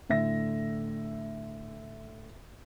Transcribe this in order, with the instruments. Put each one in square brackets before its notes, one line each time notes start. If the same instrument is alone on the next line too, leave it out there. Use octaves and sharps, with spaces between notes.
[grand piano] A2 D3 E5 A#6